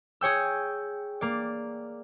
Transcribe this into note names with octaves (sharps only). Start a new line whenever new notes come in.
G#4 C#5 G5 E6
A#3 D5